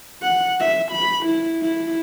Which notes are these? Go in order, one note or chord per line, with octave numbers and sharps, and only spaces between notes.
F#5
E5
B5
E4
E4